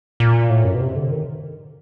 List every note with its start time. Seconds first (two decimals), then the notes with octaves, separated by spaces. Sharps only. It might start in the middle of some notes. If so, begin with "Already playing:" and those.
0.20 A#2
0.50 A2
0.65 F#2
0.75 B2
0.81 C3
0.96 D3
1.11 D#3